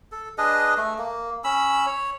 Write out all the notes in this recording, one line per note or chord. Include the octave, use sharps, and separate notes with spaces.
A4
D4 G#4 B4 D#5
A3
A#3
C#4 B5 E6
C#5